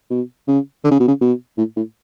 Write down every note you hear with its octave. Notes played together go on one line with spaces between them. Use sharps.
B2
C#3
D3
C#3
B2
C#3
B2
A2
A2